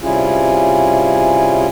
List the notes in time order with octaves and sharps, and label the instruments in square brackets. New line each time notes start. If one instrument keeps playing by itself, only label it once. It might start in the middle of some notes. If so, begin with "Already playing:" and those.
[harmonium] C3 G3 C#4 E4 F4 G#4